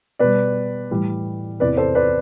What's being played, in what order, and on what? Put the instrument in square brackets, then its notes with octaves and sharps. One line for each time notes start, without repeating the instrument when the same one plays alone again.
[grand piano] B2 G3 B4 D5
A2 E3 G3
E2 C3 E3 B4 D5
A4 C5
B4 D5